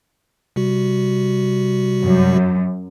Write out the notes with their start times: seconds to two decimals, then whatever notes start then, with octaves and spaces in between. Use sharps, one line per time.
0.56 C3 G3 F#4
2.03 F#2